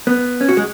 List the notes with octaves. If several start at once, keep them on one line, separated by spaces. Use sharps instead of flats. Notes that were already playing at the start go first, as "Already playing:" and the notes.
B3
C#4
F#4
G#3